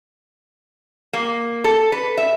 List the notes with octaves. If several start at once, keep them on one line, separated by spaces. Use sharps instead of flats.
A#3
A4
B4
E5